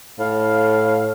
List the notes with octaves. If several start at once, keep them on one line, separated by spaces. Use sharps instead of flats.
A2 F5